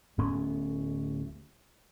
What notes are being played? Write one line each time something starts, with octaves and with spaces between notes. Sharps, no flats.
D1 A2 B3 C#4